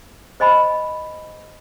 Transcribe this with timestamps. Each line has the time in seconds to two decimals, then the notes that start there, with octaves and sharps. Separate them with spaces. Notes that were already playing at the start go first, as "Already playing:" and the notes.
0.40 C5 D#5 G#5 B5